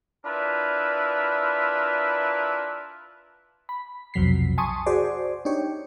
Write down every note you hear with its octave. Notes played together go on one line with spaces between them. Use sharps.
D4 E4 F4 A#4 B4
B5
B1 F2 C3 F#3 B6 C7
G#5 A5 C6 C#6 D#6
F#4 G#4 C5 D5
D4 D#4 G4 C#5